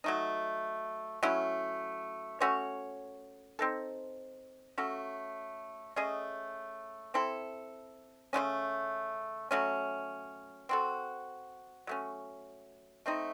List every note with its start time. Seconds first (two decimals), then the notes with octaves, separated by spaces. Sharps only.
0.04 F#3 A3 D#4
1.23 F#3 A3 C#4 E4
2.40 A3 C#4 F#4 C#5
3.59 C4 D#4 A4
4.78 A3 C#4 F#4 A4
5.96 A3 C#4 G#4 D#5
7.14 C4 E4 A4
8.33 C#3 F#3 A3 C#4
9.51 F#3 A3 C#4
10.69 C4 F#4 A4
11.87 F#3 A3 C#4
13.06 A3 C4 D#4